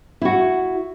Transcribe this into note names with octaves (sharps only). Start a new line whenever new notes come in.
E4 F#4